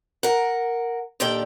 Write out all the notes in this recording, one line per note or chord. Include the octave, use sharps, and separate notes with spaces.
A#4 F#5
D#2 A#2 D3 G4 D5 G5